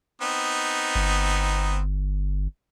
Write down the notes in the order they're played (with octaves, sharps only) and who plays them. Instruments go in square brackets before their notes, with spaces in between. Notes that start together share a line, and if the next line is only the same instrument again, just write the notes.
[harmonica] B3 C4 D#4
[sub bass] G1